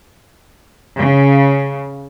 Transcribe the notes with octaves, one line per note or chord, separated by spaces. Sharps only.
C#3